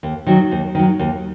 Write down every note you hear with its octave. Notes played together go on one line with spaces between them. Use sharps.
D#2
D#3 F#3
D#2
D#3 F#3
D#2